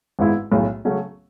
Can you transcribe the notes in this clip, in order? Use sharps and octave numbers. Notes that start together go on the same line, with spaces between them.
G#1 G#2 G#3 B3 E4
B1 A2 G#3
C#3 F#3 A3 C#4